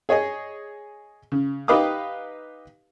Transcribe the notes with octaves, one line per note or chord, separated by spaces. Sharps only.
G#4 C#5 D#5 G#5
C#3
D#4 G4 B4 F5 D6 D#6